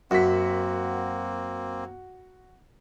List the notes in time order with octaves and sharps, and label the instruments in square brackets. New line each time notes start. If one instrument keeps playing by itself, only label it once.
[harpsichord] F#2 [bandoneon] A#3 C4 [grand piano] F#4 B6